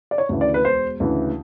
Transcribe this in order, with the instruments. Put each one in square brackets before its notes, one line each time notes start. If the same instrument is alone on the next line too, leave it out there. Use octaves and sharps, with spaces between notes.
[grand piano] D5
C#5
D2 C#3 E3
D5
B4
E1 C5
D2 C#3 E3